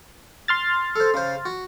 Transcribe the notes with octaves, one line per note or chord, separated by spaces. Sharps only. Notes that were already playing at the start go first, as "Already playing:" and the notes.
C6 F6 A6
A4 C5
C#3 C5
F#4